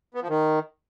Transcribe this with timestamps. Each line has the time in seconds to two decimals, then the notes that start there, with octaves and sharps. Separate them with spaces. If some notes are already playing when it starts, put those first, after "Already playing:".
0.14 B3
0.22 F3
0.29 D#3